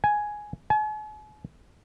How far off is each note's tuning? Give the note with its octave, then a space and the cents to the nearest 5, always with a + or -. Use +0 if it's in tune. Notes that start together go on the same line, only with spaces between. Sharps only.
G#5 +5
G#5 +45